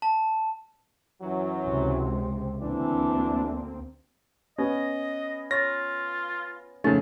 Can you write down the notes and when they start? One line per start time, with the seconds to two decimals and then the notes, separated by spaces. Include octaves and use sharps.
0.02 A5
1.21 F#2 E3 F#3
1.65 C#2 C3 C4
2.61 D2 E3 A#3 C4 D4
4.58 B3 C#4 D#5
5.51 F4 C#5 C#6 A6 A#6
6.84 F2 C#3 A3 C4 C#4 D#4 C#6 A6